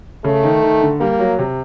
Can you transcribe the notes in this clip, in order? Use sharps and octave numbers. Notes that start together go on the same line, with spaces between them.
C#3 A3
D#3
D#3
D3
G3 A#3
F#3
C3